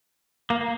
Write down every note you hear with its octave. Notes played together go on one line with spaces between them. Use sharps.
A#3
A#3